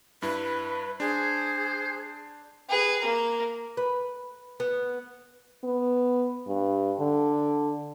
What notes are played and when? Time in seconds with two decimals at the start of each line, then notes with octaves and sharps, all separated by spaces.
0.22 G2 E4 B4
1.00 D4 G#4 C5
2.69 G#4 B4
3.01 A#3 A#4
3.77 B4
4.60 B3
5.64 B3
6.47 G2
7.00 D3